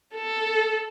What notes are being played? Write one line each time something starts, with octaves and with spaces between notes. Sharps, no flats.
A4